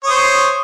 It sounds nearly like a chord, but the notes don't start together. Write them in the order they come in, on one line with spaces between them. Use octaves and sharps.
C#5 D#6 C5